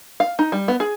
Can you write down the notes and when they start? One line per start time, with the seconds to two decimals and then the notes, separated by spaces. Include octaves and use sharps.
0.20 F5
0.39 D#4
0.52 G3
0.68 B3
0.80 G#4